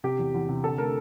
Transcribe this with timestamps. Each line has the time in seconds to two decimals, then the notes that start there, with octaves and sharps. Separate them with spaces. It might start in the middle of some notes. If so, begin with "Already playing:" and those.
0.04 C3 G4
0.19 E2
0.34 E2
0.49 C3
0.64 D3 A4
0.78 A3 A#4